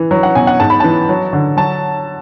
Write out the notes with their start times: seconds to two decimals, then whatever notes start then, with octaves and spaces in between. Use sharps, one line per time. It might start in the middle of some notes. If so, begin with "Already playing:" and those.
Already playing: E3
0.11 F#3
0.23 F#5
0.35 B2 G#5
0.47 F#5
0.60 G#2 A5
0.70 B5
0.80 E3 A5
1.09 F#3
1.33 D3
1.57 F#3 A5